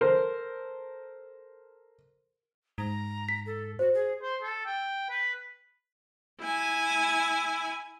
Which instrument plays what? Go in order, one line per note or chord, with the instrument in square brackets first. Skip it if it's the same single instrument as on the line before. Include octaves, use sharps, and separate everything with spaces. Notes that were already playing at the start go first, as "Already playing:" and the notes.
[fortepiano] A4 A#4 C5
[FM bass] G#2 [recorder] A#5
[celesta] B6
[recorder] A4
[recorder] F#4 [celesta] C5
[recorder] G#4
[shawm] C5
A4
G5
B4
[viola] E4 G#5